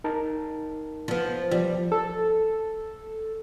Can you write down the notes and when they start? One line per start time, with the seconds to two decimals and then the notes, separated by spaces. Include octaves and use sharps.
0.04 D#4 A#4 A5
1.08 F3 B3
1.51 F3 G3
1.92 A4